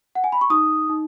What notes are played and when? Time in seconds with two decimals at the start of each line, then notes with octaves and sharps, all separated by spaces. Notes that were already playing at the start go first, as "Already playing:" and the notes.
0.15 F#5
0.24 G#5
0.32 B5
0.41 C#6
0.50 D#4 D#6
0.89 D#4